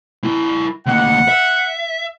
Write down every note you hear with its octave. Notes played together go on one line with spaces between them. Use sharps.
E4 A#4
D2 A#3 F#5
E5